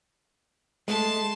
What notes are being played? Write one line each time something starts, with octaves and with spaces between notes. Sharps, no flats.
G#3 A3 A5 C6